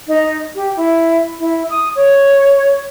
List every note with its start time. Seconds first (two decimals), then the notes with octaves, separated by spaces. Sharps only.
0.08 D#4
0.55 G4
0.77 E4
1.40 E4
1.70 D#6
1.96 C#5